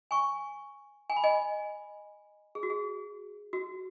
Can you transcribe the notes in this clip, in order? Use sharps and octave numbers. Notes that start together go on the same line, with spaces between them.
G#5 C#6
G#5
B5
D#5 G#5
G#4
F#4
G#4
F#4